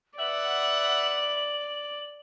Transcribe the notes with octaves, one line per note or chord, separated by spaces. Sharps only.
B4 D5 E5 F#5 F#7